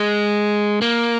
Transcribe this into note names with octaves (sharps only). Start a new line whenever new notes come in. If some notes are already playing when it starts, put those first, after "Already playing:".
Already playing: G#3
A#3